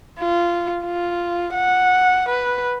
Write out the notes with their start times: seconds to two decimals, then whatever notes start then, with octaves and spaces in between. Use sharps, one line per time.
0.19 F4
0.84 F4
1.54 F#5
2.29 B4